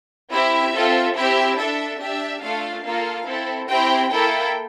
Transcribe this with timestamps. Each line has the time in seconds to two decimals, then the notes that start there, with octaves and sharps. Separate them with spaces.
0.31 C4 E4 G4 E5
0.74 C4 F4 A4
1.15 C4 E4 G4 E5
1.58 D4 A4 E5
2.00 D4 G4 E5
2.42 A3 D4 F4 A4 F5
2.84 A#3 F4 A4 F5
3.26 C4 E4 A4
3.69 C4 E4 G4 G5
4.10 A#3 E4 A4 G5